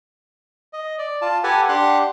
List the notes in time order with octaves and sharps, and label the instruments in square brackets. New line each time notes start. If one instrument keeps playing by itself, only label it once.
[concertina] D#5
D5
F4 A5
G4 A4 B4 F#5 G#5
D4 G4 F#5 C6 F#6